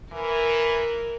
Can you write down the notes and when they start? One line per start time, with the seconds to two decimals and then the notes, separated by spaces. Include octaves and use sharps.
0.12 E3 A#4